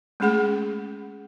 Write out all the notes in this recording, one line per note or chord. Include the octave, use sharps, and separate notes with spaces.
G#3 A3 C#4 G#4 F#5